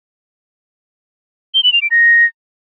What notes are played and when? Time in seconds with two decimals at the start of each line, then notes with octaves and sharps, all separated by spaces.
1.54 G7
1.64 F#7
1.73 F7
1.82 D7
1.91 A#6